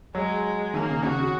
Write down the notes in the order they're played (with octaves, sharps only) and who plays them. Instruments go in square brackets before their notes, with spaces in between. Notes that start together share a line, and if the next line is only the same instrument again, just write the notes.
[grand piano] F#3 [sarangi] G#3
[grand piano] D#3 [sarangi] A#3
[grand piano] C#3
[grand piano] C#3 [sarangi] F#4
[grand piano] C#3